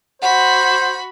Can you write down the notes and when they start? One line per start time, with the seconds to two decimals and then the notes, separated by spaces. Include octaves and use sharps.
0.22 F#4 C5 F#5 B5